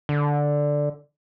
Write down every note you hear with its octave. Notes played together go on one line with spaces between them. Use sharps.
D3